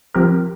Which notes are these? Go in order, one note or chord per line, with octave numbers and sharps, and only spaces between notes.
F3 C4 G4 A#4